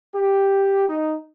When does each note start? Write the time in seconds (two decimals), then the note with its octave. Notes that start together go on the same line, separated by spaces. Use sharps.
0.14 G4
0.89 D#4